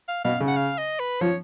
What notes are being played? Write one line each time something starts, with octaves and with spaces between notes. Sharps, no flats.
F5
B2 F5
C#3
F#5
F5
D#5
B4
F3 C#5